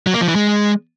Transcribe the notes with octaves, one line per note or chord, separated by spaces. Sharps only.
F#3
A#3
F3
E3
G#3